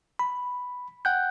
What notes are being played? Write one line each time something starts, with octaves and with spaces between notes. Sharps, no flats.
B5
F#5 G5 F#6 G6